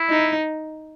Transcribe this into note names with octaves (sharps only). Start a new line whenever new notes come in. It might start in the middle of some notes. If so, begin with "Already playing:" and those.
Already playing: E4
D#4